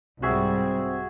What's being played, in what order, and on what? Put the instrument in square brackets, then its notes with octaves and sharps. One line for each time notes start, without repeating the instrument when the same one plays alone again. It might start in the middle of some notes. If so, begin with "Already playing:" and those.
[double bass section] C2 G#2 G3 [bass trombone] C4 [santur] F#4 G#4 E5